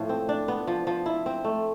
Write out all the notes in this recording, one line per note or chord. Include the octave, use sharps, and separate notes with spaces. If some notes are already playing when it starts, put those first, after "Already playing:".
Already playing: A2 F3 A3
C4
D4
B3
F3
F3
E4
C4
A3